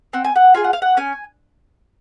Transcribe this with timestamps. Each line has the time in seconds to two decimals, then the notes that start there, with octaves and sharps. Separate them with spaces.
0.13 C4 F#5
0.25 G#5
0.36 F#5
0.54 F4 G#4 G#5
0.64 F#5
0.73 F5
0.82 F#5
0.97 C#4 G#5